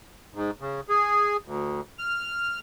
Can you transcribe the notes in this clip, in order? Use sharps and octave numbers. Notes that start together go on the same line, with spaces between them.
G#2
C#3
G#4
D2
F6